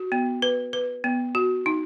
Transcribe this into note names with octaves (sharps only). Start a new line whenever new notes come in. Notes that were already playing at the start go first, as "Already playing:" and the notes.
Already playing: F#4
B3
B4
B4
B3
F#4
D#4